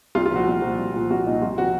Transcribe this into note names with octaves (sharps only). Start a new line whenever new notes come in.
C2 F4
F4
A#2 F3 F#4
C2
A#2 F3
C2
A#2 F3
C2 F#4
A#2 F3 D#4
C2 F4
C3 F3 F#4